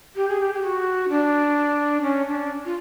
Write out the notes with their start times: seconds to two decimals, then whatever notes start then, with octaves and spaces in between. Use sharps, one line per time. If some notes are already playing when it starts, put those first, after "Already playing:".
0.16 G4
0.28 G#4
0.40 G4
0.54 G4
0.62 F#4
1.09 D4
2.02 C#4
2.26 D4
2.65 F4